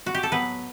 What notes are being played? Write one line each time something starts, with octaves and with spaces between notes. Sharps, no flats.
F#4
G4
A4
A2 F#3 B3 B4